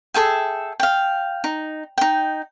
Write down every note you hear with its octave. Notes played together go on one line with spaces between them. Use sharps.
G#4 A4 E5 G5
F5 G5
D#4
D#4 G5